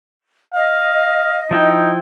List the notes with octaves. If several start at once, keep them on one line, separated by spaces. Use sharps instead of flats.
D#5 F5
F3 D#4 E4 G5